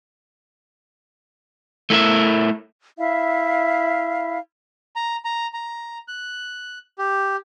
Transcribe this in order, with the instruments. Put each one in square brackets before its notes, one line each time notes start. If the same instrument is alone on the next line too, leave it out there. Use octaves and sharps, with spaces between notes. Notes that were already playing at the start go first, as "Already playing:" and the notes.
[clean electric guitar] A3 E4 A#4 E5
[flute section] E4 E5 F5
[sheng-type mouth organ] A#5
A#5
A#5
F#6
G4